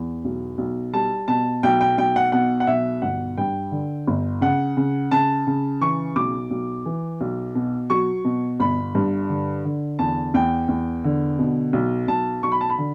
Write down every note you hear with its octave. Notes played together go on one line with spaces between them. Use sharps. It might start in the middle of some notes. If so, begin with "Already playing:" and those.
Already playing: E2
B1
B1
G3 A5
B2 A5
B1 G5
G5
B1 G5
F#5
B2 F#5
F#5
B1 E5
G1 F#5
G2 G5
D3
G1
C#3 F#5
C#3
C#3 A5
C#3
E3 C#6
B1 D6
B1
E3
B1
B2
F#3 C#6
B2
G1 B5
G2
D3
D3
E2 A5
E2 G5
E2
D3
B2
B1
B1 A5
B1 C#6
B5
A5
B5
D3